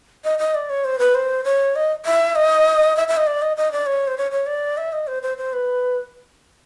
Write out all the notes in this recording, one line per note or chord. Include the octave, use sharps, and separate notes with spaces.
D#5
D#5
D5
C#5
C5
B4
C5
C#5
D#5
E5
D#5
E5
E5
D#5
D5
D#5
D#5
D5
C#5
C5
C#5
C#5
D5
E5
D#5
C5
C5
C5
B4